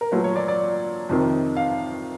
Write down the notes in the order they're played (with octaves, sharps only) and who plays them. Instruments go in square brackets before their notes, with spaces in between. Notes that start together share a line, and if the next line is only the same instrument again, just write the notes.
[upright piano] A#4
A#2 F#3 A3 B4
C#5
D5
D5
F2 C3 D#3
F5